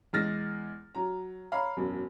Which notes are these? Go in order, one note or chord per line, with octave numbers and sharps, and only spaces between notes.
E2 G#3 F6 A6 A#6
F#3 A#5
C#5 F5 A#5 B5
E1 F#2